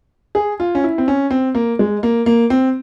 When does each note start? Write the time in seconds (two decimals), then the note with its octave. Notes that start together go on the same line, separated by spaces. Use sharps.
0.35 G#4
0.60 F4
0.75 C#4
0.84 E4
0.98 C4
1.08 C#4
1.31 C4
1.55 A#3
1.79 G#3
2.03 A#3
2.26 A#3
2.50 C4